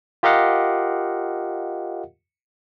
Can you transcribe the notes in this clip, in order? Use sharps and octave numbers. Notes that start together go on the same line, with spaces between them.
F4 G4 A#4 D#5 F5 F#5